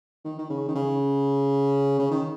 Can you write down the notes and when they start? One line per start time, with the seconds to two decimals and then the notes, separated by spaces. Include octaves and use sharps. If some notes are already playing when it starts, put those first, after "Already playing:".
0.24 D#3
0.38 D#3
0.49 C#3
0.68 D#3
0.75 C#3
1.99 C#3
2.11 D#3